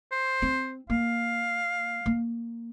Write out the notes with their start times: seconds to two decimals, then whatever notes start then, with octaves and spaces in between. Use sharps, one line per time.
0.12 C5
0.42 C4
0.90 A#3 F5
2.06 A#3